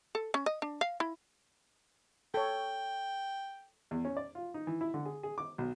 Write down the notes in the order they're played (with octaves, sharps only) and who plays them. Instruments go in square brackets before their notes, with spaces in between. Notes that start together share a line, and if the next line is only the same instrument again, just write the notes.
[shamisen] A4
C#4
D#5
D4
F5
E4
[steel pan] A4 C#5 [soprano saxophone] G5
[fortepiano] E2
C#4
D5
F4
D#4
E3
E4
D3
G#4
G#4
D6
B1